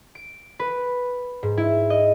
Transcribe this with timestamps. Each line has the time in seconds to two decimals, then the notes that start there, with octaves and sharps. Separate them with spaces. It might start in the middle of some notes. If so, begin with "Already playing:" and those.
0.15 D7
0.59 B4
1.43 G#2
1.58 E4
1.90 D#5